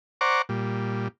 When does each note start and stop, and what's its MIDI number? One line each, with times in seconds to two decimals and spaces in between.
0.21 0.42 72
0.21 0.42 74
0.21 0.42 78
0.21 0.42 82
0.21 0.42 85
0.21 0.42 86
0.49 1.08 46
0.49 1.08 55